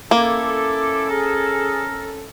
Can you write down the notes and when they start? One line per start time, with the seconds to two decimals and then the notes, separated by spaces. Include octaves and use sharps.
0.11 A#3 C#4 E4 A4 D6
1.10 G#4 A#4